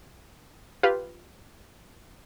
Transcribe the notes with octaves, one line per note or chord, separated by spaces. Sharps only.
F4 G4 B4 F5